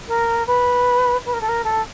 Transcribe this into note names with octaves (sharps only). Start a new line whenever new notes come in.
A#4
B4
B4
A#4
A4
A#4
A4